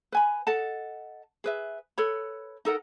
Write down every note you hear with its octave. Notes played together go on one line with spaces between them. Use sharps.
B4 G#5 B5
A4 D#5 F#5 A5
G#4 B4 E5
A4 B4 C#5 B5
D#4 A4 A#4 F#5